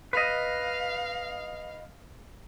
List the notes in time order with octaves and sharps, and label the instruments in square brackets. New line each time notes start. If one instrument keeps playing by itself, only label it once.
[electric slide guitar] B4 D#5 [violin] F5